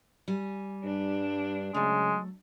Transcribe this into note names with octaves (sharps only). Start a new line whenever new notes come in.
G3 G#5
G2 D4
C#3 F#3 G#3 A3